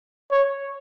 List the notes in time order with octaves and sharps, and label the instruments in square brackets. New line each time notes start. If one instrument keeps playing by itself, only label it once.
[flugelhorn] C#5